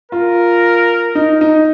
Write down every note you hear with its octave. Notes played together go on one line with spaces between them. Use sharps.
F4 A#4
D#4
D#4